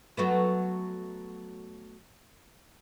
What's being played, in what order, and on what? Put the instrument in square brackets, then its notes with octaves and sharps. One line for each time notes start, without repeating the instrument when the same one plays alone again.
[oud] F#3 A3 B3